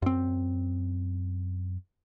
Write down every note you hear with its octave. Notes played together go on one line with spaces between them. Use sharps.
F#2 C4